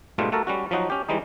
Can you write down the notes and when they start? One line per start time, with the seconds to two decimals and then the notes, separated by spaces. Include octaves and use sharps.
0.18 G#2 B2 G3 A3 F4
0.32 A3 F#4 A4 A#4
0.47 G3 C#4 F#4
0.71 F3 F#3 D#4 F#4
0.90 C#4 G4
1.09 E3 G3 G#3 D#4